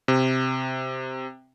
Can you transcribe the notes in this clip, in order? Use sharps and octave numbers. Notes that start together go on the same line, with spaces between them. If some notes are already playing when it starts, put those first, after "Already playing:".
C3